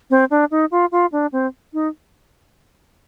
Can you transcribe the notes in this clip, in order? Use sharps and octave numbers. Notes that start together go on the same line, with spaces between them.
C4
D4
D#4
F4
F4
D4
C4
D#4